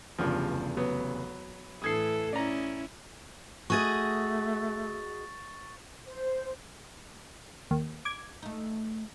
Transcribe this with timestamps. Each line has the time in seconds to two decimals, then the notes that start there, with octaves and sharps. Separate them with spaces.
0.19 F1 E2 G2 C#3 F3
0.77 F#3 B3 B4
1.82 A2 E3 A4 D#6 G#6 C7
2.33 C#4 E4 D5 A#5
3.70 A3 F#4 G#4 D#5 C#6 A6
6.07 C5
7.71 D#2
8.05 D6 G#6
8.43 A3 D#4